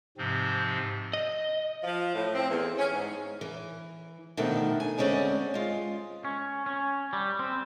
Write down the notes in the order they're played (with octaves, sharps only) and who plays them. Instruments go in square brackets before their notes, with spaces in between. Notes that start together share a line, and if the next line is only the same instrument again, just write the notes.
[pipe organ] G#2 C3 F3 C4
[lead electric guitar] D#5
[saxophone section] F3
A2
C4
E2
C#4
G#2
[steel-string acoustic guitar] E3
B2 D3 D#3 F3 A3
G#5
D2 G#3 C4 C#4 D5 F#5
G#3 F4
[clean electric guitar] C#4
C#4
G3
C4